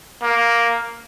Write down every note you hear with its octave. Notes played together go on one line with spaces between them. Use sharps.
A#3